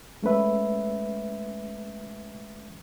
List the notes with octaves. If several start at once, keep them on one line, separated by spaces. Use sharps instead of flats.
G#3 A3 C#4 B4 E5